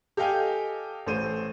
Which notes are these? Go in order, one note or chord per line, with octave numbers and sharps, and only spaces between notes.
G4 A4 D#5 F5 G5 G#5
A1 A3 C5 D#7